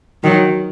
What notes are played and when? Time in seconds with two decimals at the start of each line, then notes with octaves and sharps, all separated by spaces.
0.23 D#3 F#3